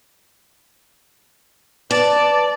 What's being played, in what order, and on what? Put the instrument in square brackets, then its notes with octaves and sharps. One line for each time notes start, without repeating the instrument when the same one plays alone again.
[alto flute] B4 [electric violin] D5 [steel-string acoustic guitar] A5